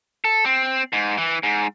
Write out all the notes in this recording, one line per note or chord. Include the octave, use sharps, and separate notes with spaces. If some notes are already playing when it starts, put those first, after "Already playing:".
A4
C4
G#2
E3
G#2